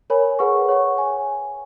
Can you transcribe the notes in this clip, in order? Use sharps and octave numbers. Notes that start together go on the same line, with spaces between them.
A#4 C#5 G#5 B5
G#4 B4 F#5 C#6
C#5 F#5 C#6
G#5